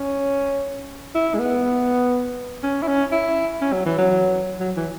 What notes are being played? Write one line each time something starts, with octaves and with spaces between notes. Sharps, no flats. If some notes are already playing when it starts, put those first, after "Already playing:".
Already playing: C#4
E4
G#3
B3
C#4
E4
C#4
E4
C#4
F#3
E3
F#3
F#3
E3